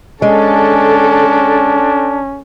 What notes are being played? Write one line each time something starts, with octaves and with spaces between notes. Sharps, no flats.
G#3 C#4 D4 A4